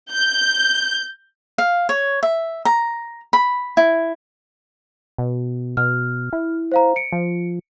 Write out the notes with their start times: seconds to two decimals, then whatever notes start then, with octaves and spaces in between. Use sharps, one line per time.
0.12 G6
1.58 F5
1.89 C#5
2.23 E5
2.65 A#5
3.33 B5
3.77 E4
5.18 B2
5.77 B2 F6
6.33 E4
6.72 C5 F5 A#5
6.96 C#7 D7
7.12 F3